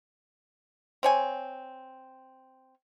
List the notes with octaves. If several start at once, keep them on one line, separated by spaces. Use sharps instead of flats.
C4 C#5 G#5